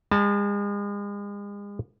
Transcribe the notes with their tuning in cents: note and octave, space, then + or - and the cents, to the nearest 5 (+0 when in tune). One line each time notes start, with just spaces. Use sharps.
G#3 -40 A5 +0